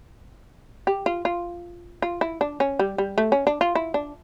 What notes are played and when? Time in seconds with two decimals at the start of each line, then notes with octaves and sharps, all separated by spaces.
0.87 G4
1.06 F4
1.25 F4
2.02 F4
2.21 E4
2.41 D4
2.60 C#4
2.79 G3
2.98 G3
3.18 A3
3.32 C#4
3.47 D4
3.61 F4
3.75 E4
3.94 D4